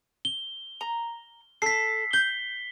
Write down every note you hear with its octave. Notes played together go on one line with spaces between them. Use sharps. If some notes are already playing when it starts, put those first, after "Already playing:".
G7
A#5
A4 B6 C7
G6 G7